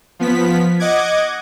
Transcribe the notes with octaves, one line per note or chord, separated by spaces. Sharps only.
F3 B3 B6
D#5 F#5 D6 G#6